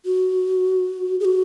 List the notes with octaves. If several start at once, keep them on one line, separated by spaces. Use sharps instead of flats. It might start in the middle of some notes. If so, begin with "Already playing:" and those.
F#4
G#4
F#4